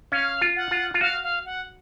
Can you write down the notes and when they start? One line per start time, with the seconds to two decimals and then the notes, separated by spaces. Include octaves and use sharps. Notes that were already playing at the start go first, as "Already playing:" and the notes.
0.12 C#4 F5
0.41 F4
0.56 F#5
0.71 F4
0.94 F4
1.01 F#4 F5
1.24 F5
1.45 F#5